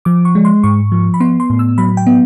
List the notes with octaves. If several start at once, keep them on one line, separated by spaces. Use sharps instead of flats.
F3 D6
C#6
G#3
C6
G#2 C#6
F3
B5
B3 C6
C6
A2
E6
F#3 B5
G5
B3